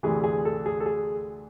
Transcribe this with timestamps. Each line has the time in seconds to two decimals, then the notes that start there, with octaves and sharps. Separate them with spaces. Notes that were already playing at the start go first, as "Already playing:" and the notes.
0.03 D2 C3 E3 G#4
0.24 G#4
0.45 A4
0.66 G#4
0.80 A4
0.86 G#4